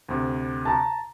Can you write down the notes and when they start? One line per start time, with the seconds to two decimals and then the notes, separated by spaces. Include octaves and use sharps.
0.09 D2 C3
0.65 A5 A#5